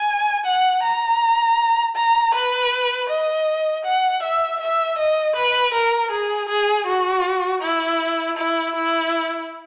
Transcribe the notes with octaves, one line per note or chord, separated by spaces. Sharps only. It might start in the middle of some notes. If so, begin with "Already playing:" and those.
Already playing: G#5
F#5
A#5
A#5
B4
D#5
F#5
E5
E5
D#5
B4
A#4
G#4
G#4
F#4
E4
E4
E4